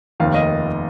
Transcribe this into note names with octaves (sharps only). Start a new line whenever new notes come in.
F1 D#2 D#3 F5
D#5